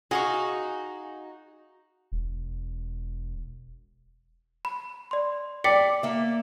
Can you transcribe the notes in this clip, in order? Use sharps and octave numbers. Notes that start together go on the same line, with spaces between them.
D#4 F#4 G#4 F5 C#6
E1
B5
D5 C6
D5 G5 B6 C#7
A#3 E5